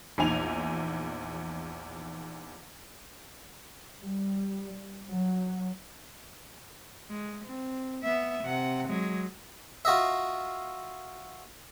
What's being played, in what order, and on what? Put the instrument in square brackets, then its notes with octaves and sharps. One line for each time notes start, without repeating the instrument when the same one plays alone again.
[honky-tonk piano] A#1 E2 D#4 G#5 F7
[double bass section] G3
F#3
[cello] G#3
C4
B3 E5
C3 F#5
F#3 G#3
[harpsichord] F4 F#4 D#5 E5